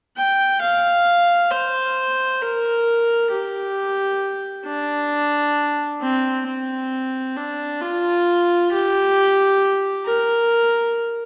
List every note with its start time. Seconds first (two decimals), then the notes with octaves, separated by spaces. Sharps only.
0.17 G5
0.61 F5
1.51 C5
2.42 A#4
3.31 G4
4.66 D4
6.01 C4
6.47 C4
7.36 D4
7.81 F4
8.72 G4
10.06 A#4